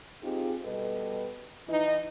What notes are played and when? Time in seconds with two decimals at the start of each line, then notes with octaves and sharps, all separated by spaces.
0.23 C4 D#4 F4 G4 G#4
0.65 B2 G3 G4 A4 B4 D#5
1.68 E3 D#4